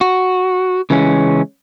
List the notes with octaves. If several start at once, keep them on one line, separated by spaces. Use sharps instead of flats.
F#4
C#3 E3 G#3 C#4